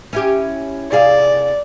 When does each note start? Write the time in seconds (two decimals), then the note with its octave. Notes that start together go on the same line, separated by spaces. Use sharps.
0.13 C#4 E4 G4
0.92 C3 G#4 D5 F5